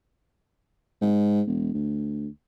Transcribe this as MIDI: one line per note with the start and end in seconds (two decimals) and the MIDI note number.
1.01 1.42 44
1.47 1.71 28
1.74 2.28 38